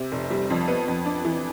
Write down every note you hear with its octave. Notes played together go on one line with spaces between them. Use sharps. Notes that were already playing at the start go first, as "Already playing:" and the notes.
Already playing: C3
F1
G3
F2
B3
F2
D4
E3